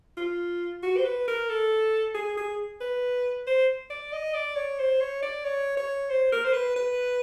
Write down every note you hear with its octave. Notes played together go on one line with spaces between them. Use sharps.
F4
F#4
C5
B4
A#4
A4
G#4
G#4
B4
C5
D5
D#5
D5
C#5
C5
C#5
D5
C#5
C#5
C5
A#4
C5
B4
B4